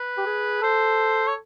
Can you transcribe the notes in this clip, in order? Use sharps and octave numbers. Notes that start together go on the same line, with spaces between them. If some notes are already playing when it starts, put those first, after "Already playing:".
Already playing: B4
G4
G#4
A4 C5
C#5